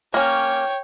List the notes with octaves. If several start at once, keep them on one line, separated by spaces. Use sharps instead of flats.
A#3 C#4 C#5 G5